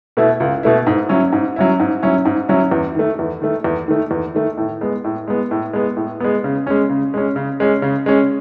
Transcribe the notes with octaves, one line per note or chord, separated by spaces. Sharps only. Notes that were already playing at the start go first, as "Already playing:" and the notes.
B2 A3 E4
C#2
B2 A3 E4
G#2
F#3 C#4 E4
G#2
F#3 C#4 E4
G#2
F#3 C#4 E4
G#2
F#3 C#4 E4
E2
D#3 A3
E2
D#3 A3
E2
D#3 A3
E2
D#3 A3
A2
G#3 B3
A2
G#3 B3
A2
G#3 B3
A2
G#3 B3
C#3
G#3 C#4
C#3
G#3 C#4
C#3
G#3 C#4
C#3
G#3 C#4